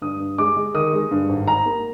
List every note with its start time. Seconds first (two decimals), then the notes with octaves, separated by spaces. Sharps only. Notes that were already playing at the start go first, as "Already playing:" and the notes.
0.02 G2 D#6
0.20 G2
0.38 G#3 D6
0.56 G#3
0.74 D#3 D#6
0.93 G#3
1.11 G2
1.29 G#1
1.47 G#2 A#5
1.66 A#3